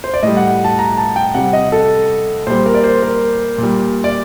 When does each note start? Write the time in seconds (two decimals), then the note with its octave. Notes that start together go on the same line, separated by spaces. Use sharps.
0.04 C5
0.14 D5
0.23 A2 G3 D#5
0.37 F#5
0.64 A5
0.79 A#5
0.98 A5
1.16 G5
1.34 C3 G3 F#5
1.53 D#5
1.72 A4
2.47 A#2 G3 C5
2.66 A#4
2.75 D5
2.84 C5
3.02 A#4
3.58 A#2
3.63 G3
4.04 D5